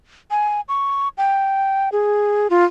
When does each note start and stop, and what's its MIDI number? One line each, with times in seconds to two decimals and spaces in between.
0.31 0.61 80
0.68 1.08 85
1.18 1.89 79
1.92 2.47 68
2.50 2.65 65